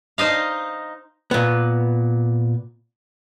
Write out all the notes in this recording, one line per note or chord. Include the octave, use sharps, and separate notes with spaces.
D#4 C5 D#5 F5
A#2 B3